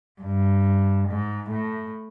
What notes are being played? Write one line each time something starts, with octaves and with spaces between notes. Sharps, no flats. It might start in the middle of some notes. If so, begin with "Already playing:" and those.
G2
G#2
A2